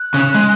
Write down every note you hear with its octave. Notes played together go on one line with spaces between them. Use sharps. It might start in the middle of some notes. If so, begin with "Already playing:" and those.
Already playing: F#6
C#3
G#3